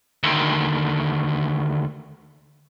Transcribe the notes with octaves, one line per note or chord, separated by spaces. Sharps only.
D2 D#3